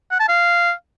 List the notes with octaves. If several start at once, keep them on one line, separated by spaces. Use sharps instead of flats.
F#5
A5
F5